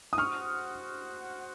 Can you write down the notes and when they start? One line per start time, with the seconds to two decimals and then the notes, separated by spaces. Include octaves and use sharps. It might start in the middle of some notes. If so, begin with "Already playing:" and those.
0.13 D#6
0.18 F#4 C5 F#5 C#6 F6